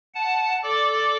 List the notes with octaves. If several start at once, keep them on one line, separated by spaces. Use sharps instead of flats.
F#5 A5
A4 D5 D6